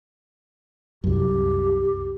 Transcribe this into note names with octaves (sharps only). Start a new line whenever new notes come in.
C2 F#2 G4